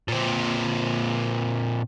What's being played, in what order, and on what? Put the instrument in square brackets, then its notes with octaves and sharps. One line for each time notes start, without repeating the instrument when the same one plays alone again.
[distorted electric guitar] A#2 C4